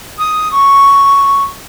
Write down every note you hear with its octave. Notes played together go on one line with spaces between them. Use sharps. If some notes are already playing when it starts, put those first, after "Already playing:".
D#6
C#6